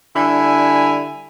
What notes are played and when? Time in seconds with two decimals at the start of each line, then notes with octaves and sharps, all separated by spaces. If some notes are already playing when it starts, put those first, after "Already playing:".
0.16 D3 G3 E4 G#5